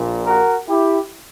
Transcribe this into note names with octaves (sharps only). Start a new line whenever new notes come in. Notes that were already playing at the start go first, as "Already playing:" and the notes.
Already playing: A#1 A#2
F#4 A#4
E4 G4